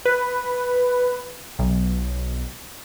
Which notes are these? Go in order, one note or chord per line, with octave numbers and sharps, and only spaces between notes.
B4
B1